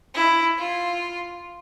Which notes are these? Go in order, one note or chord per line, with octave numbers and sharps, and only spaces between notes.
E4
F4